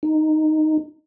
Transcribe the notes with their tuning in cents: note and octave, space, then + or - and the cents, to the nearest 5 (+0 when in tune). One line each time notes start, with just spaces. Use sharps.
D#4 -5